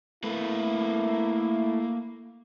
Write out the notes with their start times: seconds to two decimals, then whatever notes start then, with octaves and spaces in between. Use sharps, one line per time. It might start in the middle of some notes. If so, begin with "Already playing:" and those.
0.24 A3 A#3 E4 B4